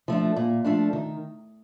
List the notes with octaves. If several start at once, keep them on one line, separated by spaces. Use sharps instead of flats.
F3 A3 D4
A#2
F3 A3 D4
D#3